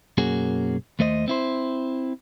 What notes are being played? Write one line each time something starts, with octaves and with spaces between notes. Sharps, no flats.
B1 F#2 A#3 C#4 F#4 G#4
D#2 A3 C5 D#5
C4 E4 C5